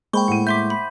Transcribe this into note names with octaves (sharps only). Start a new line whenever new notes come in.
G#3 A#3 C5 G5 B5 C#6 G7
A2 F#5 D#7
E5 C6 D6 G6 B6
B5